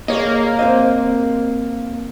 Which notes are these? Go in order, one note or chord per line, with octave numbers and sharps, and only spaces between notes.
A#3 G#4 C#5 D#5
C4 C5 D#5